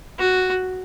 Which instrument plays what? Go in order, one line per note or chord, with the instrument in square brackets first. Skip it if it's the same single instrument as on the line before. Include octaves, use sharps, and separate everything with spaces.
[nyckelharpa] F#4